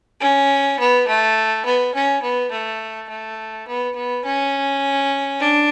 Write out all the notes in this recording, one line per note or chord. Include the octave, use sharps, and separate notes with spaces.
C#4
B3
A3
B3
C#4
B3
A3
A3
B3
B3
C#4
D4